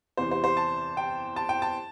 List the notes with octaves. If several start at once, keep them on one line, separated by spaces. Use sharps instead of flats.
E2 C3 E3 C5
C5
C5
A5
G5
A5
G5
A5